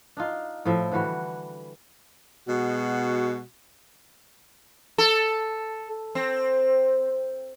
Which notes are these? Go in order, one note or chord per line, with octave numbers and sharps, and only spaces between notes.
D4 D#4 F4
A2 F3 E5
D3 E3 G3 F#4
B2 G#3 F#4
A4
C4